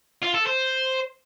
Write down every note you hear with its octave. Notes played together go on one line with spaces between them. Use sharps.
F4
A4
C5